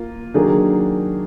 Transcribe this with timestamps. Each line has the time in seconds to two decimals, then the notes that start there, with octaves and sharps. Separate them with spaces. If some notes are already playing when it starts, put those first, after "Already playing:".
Already playing: A#3 F4
0.34 D#3 F#3 A#3 D4 G#4